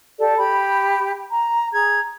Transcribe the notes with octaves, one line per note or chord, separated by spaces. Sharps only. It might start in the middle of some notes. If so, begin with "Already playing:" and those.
G4 A4 D5
G4 B5
A#5
G#4 A#5 G#6